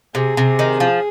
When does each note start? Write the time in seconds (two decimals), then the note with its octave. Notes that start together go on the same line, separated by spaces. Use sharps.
0.15 C3 G#4
0.37 C3
0.59 D#3
0.80 F3